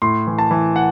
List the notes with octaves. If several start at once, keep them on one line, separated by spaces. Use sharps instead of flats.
A2 C6
E3
A5
E3
F#5